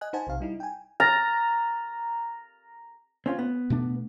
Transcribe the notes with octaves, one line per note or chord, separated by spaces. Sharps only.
D#5 G#5 F#6
D#4 C5 F#5 G#5 A5
B1 C3 F5
G3 D#4 E4
G5 G#5
A#5 F6 A6 A#6
C4 C#4 F4
B3
B2 A3 D4